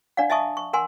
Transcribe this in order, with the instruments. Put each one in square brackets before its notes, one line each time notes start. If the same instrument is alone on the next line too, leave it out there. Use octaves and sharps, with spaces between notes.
[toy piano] D4 D5 F5 F#5
D#5 E5 G#5 A5 C#6 D#6
C#6
A#4 F#5 G#5 C6